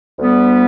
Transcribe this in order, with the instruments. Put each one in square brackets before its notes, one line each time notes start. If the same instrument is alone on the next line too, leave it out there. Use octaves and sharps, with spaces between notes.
[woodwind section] D2 D3 G3 B3